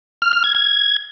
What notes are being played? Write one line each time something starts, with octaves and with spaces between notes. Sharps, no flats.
F6
F6
G#6
G#6